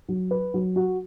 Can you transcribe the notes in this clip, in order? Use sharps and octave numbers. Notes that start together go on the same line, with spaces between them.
F#3
B4
F#3
F#4